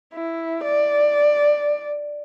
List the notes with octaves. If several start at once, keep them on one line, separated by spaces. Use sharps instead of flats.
E4
D5